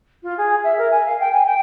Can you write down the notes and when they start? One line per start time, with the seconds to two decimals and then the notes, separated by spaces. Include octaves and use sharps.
0.23 F4
0.38 G#4
0.64 E5
0.78 A#4
0.90 G#5
1.06 F5
1.20 G5
1.32 G#5
1.46 G5